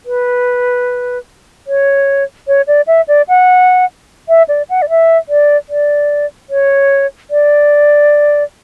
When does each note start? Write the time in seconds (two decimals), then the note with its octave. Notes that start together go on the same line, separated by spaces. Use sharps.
0.06 B4
1.67 C#5
2.48 C#5
2.67 D5
2.87 E5
3.08 D5
3.29 F#5
4.29 E5
4.48 D5
4.70 F#5
4.82 D5
4.90 E5
5.29 D5
5.69 D5
6.50 C#5
7.31 D5